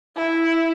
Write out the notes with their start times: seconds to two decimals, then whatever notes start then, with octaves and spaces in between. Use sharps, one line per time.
0.16 E4